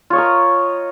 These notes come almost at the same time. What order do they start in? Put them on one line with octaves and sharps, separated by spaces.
F4 C#5 D#5 A#4